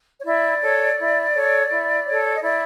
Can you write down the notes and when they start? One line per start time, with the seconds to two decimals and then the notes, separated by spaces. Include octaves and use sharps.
0.20 C#5
0.24 E4 D5
0.61 A4 C#5
0.98 E4
1.34 A4 C#5
1.70 E4
2.06 A4 C#5
2.34 D#5
2.42 E4 D5